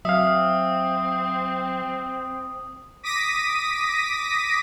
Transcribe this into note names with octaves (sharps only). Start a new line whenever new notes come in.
F#3 C4 E5 F5 D#6
D6 D#6 A#6 B6 D#7